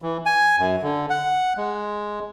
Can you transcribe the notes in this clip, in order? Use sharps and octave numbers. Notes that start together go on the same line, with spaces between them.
E3
G#5
F#2
D3
F#5
G#3